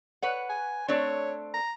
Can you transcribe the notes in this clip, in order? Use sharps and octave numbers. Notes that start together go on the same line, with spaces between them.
B4 C#5 F#5
G#5
A3 C4 D4 C#5
A#5